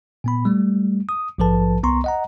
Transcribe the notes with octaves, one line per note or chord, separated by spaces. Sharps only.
A#2 B3 B5
G3 A3
D#6
A#1 G#2 F3 A4 B4 A5
C2 B3 A#5 C6 C#6
D#5 F#5 A#5